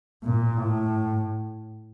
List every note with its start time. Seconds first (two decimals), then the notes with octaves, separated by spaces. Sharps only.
0.24 A#2
0.57 A2